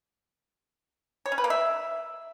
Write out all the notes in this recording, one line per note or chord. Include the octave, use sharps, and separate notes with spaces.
C#5
C#4
B4
A#3
E5